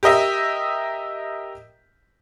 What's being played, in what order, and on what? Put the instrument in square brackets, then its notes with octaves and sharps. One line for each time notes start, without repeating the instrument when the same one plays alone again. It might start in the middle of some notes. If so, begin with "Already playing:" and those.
[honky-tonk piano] G4 A#4 D#5 E5